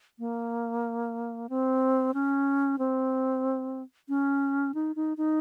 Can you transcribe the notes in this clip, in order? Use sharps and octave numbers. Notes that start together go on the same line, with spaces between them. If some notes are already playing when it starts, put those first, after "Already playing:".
A#3
C4
C#4
C4
C#4
D#4
D#4
D#4